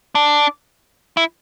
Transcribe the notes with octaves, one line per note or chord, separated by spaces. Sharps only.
D4
E4